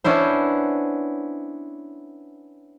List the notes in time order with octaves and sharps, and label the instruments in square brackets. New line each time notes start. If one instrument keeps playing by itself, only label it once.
[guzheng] B3 C#4 D4 E4 C5